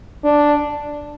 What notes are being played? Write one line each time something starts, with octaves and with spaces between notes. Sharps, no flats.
D4